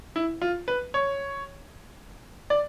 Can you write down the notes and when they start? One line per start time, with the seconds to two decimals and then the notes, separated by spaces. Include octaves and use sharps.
0.16 E4
0.42 F4
0.68 B4
0.94 C#5
2.50 D5